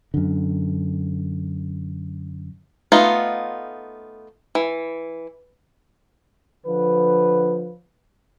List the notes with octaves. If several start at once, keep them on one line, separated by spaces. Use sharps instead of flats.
F#2 D3
A3 B3 D#4 F4
E3
D3 F3 B4